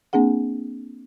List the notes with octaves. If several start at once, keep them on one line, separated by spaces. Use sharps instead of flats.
A#3 C4 D4 G#4 F#5